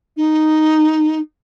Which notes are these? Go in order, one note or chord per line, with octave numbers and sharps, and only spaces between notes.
D#4